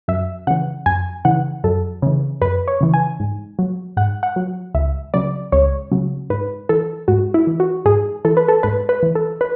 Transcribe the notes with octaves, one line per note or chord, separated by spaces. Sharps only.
F#2 E5
C#3 E3 F#5
F#2 G#5
C#3 E3 F#5
F#2 A4
C#3 E3
F#2 B4
C#5
C#3 E3
G#5
G#2
F#3
G#2 F#5
F#5
F#3
C#2 E5
C#3 F#3 D5
C#2 C#5
C#3 F#3
G#2 B4
E3 A4
G#2 F#4
E4
E3
F#4
G#2 G#4
E3 A4
B4
A4
G#2 B4
B4
E3
A4
B4